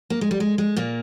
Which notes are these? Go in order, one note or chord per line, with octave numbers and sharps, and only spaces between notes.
A#3
G#3
G3
G#3
G#3
A#2 A#3